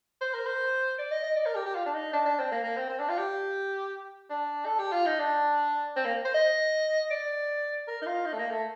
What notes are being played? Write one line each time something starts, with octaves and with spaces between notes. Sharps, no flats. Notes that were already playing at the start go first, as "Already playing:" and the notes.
C5
A#4
C5
D5
D#5
D#5
D5
A#4
G4
G4
F4
D4
D#4
D4
D4
C4
A#3
A#3
C4
C4
D4
F4
G4
D4
A4
G4
F4
D#4
D4
C4
A#3
C5
D#5
D5
A#4
D#4
F4
D#4
A3
A#3
A3